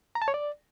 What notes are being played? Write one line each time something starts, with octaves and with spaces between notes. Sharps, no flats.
A#5
A5
C#5
D5